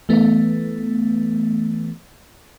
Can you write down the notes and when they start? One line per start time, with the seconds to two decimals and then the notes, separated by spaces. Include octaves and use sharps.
0.09 E3 A3 B3